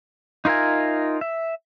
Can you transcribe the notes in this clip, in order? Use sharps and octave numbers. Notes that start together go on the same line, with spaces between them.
D#4 F4 A#4 E5 G#5
E5